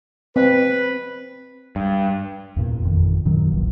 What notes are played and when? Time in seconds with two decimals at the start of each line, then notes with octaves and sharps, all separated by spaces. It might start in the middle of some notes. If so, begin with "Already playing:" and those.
0.36 C4 B4
1.76 G2
2.56 E2 A#2
2.83 G#1 F2 D#3
3.25 F#2 A#2 D#3 F#3
3.50 D#1 A#1 E2